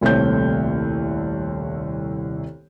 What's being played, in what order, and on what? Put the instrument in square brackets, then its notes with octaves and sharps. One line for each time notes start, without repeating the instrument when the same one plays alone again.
[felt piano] D#1 C2 A3 C4 C#5 G6